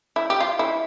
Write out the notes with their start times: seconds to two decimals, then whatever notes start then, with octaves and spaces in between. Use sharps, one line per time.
0.16 E4
0.30 G4
0.40 F4
0.59 E4